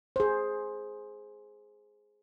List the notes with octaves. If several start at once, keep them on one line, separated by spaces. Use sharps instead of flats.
G#4 C5